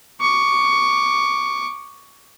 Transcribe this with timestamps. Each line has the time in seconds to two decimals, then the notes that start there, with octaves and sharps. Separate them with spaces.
0.21 C#6 D6